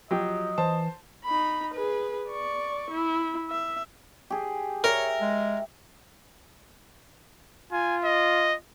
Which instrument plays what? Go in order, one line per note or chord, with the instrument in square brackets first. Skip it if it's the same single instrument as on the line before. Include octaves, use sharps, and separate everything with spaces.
[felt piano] F3 G4 [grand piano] F#3 G5 [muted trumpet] D#5
[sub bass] E3 [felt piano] C5 [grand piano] A5
[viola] D#4 B5
G#4 B4
D5 C#6
E4
E5
[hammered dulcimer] G4 G#4
[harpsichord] A#4 [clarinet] C#5 [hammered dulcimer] E5
[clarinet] G#3
[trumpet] F4 [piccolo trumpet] G#5
[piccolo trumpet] D#5